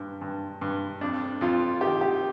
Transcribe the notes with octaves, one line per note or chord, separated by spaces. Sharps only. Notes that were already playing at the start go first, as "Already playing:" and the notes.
Already playing: G2
G2
G2
F2 D4
F2 F4
D#3 G4
G4